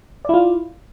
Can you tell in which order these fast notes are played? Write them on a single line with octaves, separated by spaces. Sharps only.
D5 E4 F4